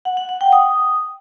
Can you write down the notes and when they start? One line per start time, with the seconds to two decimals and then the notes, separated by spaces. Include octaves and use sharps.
0.05 F#5
0.17 F#5
0.29 F#5
0.41 G5
0.52 D#6